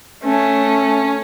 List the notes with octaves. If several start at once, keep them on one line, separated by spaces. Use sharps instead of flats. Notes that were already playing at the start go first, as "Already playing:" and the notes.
A3 C#4